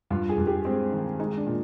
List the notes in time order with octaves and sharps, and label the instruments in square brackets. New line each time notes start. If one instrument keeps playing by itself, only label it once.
[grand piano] G2 F4
G#4
G2
G4
G#3 C4
D#3
G#3 D#4
D4
A#2